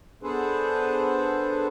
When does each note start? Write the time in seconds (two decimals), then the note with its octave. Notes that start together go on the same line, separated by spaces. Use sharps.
0.23 B3 D4 G#4 A4 B4 C5